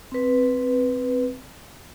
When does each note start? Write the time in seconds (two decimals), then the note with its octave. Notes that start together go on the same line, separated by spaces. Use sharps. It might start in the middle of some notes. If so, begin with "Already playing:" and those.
0.12 C4 B4